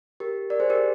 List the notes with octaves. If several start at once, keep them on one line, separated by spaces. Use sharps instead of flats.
G4 A#4
A#4 D5
G#4 C5
G4 A#4